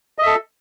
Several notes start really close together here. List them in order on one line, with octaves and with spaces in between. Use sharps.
D#5 E5 A4